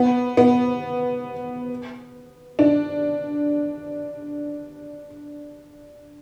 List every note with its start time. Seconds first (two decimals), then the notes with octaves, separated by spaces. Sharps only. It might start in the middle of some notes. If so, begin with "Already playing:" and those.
Already playing: B3
0.37 B3
2.59 D4